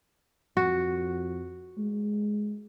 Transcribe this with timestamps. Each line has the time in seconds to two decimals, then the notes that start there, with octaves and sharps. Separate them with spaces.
0.57 F2 F#4
1.78 G#3